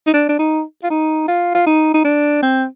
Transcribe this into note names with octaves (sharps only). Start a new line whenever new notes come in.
D#4
D4
D4
D#4
F4
D#4
F4
F4
D#4
D#4
D4
C4